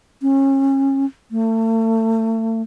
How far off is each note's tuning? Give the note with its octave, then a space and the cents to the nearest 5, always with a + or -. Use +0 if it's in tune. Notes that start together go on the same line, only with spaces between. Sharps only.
C#4 -30
A3 +35